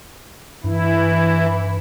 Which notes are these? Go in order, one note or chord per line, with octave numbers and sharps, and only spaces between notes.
G2 E3 E4